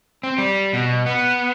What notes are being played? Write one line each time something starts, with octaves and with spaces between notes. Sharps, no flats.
C4
G3
B2
B3